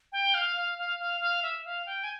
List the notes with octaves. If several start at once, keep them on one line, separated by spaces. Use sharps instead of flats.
G5
F5
F5
F5
F5
F5
E5
F5
G5
G#5